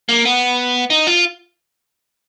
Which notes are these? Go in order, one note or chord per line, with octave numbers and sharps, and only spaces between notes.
A#3
B3
D#4
F4